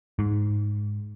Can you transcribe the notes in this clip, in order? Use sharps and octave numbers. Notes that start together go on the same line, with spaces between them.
G#2